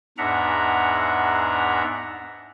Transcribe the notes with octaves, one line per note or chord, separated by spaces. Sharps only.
E2 G#2 D4 E5 F#5 A#5